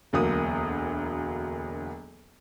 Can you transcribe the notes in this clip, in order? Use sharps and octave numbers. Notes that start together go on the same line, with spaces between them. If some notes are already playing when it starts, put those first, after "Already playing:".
E1 D2 F#3 A#3 D#6